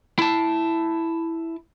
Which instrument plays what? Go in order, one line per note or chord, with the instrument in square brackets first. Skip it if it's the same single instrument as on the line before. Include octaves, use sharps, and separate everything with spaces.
[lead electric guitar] E4 A5